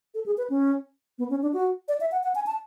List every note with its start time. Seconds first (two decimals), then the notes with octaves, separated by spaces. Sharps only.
0.14 A4
0.26 G#4
0.38 B4
0.50 C#4
1.19 B3
1.30 C#4
1.42 D4
1.53 F#4
1.88 D5
2.01 E5
2.12 F#5
2.23 F#5
2.35 G#5
2.46 A5